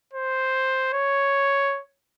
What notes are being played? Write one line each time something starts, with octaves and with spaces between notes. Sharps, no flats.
C5
C#5